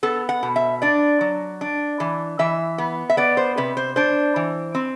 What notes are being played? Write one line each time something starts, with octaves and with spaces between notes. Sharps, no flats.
B3 A4
F#5
B2
E5
D4 D5
F#3
D4
E3
E3 E5
B3
E5
B3 D5
C5
C3 B4
C5
D4 C5
E3
C4